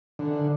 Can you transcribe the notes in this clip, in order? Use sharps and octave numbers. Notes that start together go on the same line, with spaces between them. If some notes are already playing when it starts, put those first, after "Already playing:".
D3